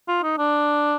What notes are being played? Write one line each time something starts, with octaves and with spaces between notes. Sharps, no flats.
F4
D#4
D4